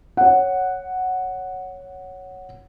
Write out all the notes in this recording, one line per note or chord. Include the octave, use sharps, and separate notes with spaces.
C#5 F#5